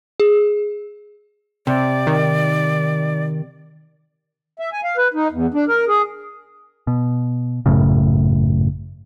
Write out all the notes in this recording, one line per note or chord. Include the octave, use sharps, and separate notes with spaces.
G#4
C3 D5
D#3
E5
G#5
F5
B4
D#4
E2
D4
A#4
G#4
B2
G#1 F#2 A2 C#3